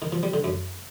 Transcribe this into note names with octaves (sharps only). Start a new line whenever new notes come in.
D#3
F3
G3
D3
F#2